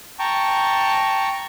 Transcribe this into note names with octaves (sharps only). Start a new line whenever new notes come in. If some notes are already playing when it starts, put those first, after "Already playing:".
G5 A5 A#5 C#6